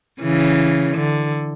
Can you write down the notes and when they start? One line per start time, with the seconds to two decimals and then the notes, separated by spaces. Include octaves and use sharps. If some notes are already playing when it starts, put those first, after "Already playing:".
0.22 C#3 E3
0.97 D3